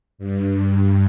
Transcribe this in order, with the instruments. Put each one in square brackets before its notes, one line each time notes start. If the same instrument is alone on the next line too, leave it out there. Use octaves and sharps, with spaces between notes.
[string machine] G2